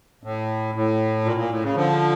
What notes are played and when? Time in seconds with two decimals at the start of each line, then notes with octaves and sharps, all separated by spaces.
0.24 A2
0.75 A2
1.24 A#2
1.37 A#2
1.50 A2
1.62 C#3
1.75 D3 F3